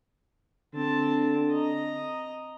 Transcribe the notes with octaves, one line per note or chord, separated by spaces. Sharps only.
D3 C4 A5
D#5 A#5